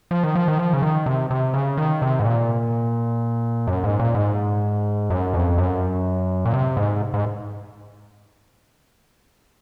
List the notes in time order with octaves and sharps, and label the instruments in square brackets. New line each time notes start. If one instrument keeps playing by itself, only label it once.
[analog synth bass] F3
D#3
F3
D#3
F3
C#3
D#3
C3
C3
C#3
D#3
C3
G#2
A#2
F#2
G#2
A#2
G#2
F#2
F2
F#2
A#2
C3
G#2
G#2